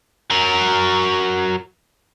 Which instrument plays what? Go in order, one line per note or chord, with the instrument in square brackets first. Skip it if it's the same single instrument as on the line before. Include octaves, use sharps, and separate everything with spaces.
[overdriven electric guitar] F#3 A#4